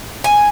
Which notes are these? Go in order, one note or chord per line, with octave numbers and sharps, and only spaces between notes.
G#5